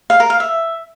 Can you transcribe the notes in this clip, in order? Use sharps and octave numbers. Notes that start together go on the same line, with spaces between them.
F5
A#4
F5
E5